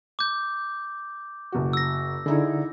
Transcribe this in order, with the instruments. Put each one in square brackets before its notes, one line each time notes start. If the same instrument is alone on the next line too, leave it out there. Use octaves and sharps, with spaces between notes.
[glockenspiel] D6 G6
[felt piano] F#1 F#4
[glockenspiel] E6 A#6
[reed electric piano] D3 [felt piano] D#4 E4 G#4